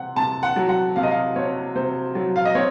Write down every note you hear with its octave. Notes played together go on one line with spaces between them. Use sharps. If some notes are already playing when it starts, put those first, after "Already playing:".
Already playing: C3 C4 F#5
C3 A5
F#5
F#3
F#5
C3 F5
D#5
F5
C4 C#5
C3 C5
F#3
F5
D#5
C4 C#5